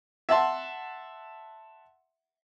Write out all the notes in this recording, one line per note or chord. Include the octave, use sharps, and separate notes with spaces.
E5 F#5 A5 C6